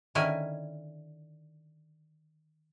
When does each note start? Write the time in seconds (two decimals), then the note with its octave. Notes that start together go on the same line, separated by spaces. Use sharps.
0.15 D3 D#3 C#4 E4 A#4 G#5